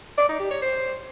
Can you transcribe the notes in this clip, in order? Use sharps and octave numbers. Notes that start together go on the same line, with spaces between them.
D5
D#4
G4
C#5
C5